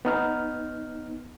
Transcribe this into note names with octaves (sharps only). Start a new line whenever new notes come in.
B3 D#4 F6